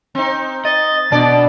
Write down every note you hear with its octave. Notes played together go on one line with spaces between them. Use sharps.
C4 D#4
D#5 A6
B2 D4 D5